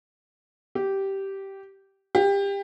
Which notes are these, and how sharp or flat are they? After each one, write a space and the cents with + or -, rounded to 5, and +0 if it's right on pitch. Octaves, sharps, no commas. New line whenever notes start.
G4 -10
G4 +25